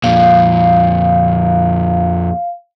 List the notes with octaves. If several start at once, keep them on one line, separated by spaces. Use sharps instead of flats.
F2 A#2 F5